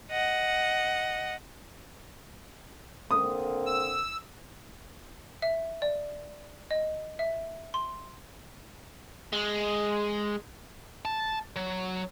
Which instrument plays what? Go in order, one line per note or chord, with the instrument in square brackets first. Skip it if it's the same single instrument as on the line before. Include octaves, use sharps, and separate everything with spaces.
[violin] D#5 F#5
[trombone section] D3 A#3 C4 [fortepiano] D#6
[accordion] E6
[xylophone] E5
D5
D#5
E5
C6
[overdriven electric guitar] G#3
[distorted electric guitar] A5
F#3